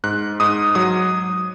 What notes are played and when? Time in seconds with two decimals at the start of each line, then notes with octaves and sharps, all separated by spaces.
0.04 G#2 F#6
0.40 G#2 D#6
0.75 F#3 D#6